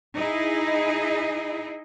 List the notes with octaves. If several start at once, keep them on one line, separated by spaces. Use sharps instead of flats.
D#4 E4 G#4 D#5